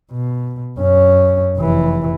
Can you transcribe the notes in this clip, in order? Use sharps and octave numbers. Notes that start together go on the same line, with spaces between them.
B2
F#2 C#4
F1 E3